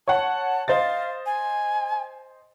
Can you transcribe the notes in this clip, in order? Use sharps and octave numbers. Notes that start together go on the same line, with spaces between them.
C#5 F#5 A5
C5 D#5 F5 A6
G#5